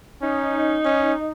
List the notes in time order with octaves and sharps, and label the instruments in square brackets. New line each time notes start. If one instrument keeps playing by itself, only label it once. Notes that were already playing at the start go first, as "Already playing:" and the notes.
[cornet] C#4 [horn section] D#4
[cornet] C#4